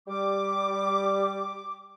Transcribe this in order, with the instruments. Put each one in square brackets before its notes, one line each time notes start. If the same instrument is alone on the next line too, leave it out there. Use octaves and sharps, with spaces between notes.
[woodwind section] G3 D6